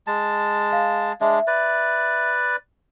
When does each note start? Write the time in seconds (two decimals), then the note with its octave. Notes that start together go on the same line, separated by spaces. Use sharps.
0.07 G#3 A5
0.72 F5
1.21 G#3 D4 E5
1.47 B4 D5